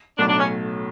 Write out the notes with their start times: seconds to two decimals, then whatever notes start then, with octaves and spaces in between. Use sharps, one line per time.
0.18 B1 A2 F#3 A3 D4
0.29 D4
0.39 C#4